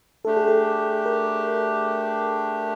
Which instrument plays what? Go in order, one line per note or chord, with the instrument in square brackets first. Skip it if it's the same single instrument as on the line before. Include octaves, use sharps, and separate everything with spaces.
[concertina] A3 D4 G4 [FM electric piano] A4
[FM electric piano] G#4
A4
A#4